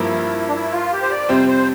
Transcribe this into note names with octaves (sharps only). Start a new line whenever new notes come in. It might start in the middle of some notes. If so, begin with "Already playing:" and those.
Already playing: G2 F3 A#3 E4
D4
E4
F4
G4
C5
D5
F2 C3 G3 C4 C5
C5